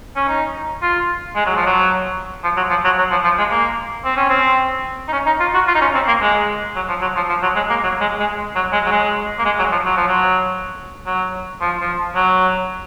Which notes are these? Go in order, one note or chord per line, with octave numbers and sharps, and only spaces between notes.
C#4
D#4
F4
G#3
F#3
F3
F#3
F3
F#3
F3
F#3
F#3
F3
F3
G#3
A#3
C4
C#4
C4
D#4
C#4
D#4
F4
F#4
F4
D#4
C#4
C4
A#3
G#3
F#3
F3
F#3
F3
F3
F#3
G#3
A#3
F#3
G#3
G#3
F#3
G#3
F#3
G#3
A#3
G#3
F#3
F3
F#3
F3
F#3
F#3
F3
F3
F#3